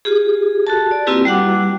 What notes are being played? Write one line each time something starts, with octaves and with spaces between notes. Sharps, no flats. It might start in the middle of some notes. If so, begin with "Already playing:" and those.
F4 G4 G#4
F#4 A4 A5
D5
A#3 C4 E4 F4 G4 B4
G3 F#4 F#5 D6